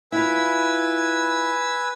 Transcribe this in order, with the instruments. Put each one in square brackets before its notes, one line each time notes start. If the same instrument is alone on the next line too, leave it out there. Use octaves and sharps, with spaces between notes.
[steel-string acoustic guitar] E4 F4 [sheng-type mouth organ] B4 G#5 E6